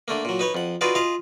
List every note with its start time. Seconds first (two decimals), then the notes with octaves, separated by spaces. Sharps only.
0.08 D3 A3 A#3
0.25 A#2 F#3
0.39 D#4 B4 C#5
0.55 F2 F#5
0.81 D#4 F4 F#4 G#4 B4 D5
0.95 F4 G#4 D#5 F5